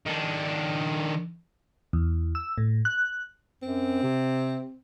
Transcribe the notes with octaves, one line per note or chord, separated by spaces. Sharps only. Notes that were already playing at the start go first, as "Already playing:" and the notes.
D#3 D4
E2
E6
A2
F#6
F#2 C4
C3